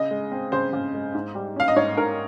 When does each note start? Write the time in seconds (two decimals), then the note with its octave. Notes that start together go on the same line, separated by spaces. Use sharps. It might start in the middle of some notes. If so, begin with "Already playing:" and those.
Already playing: C#3 D#5
0.11 G#3
0.32 C4
0.52 C#3 C5
0.73 C#3
0.94 G#3
1.14 G#2
1.35 G3
1.56 C#4 F5
1.68 D#5
1.76 G#2 C#5
1.97 G#2 A#4